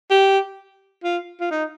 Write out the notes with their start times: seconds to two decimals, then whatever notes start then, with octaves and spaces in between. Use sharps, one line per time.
0.11 G4
1.04 F4
1.41 F4
1.51 D#4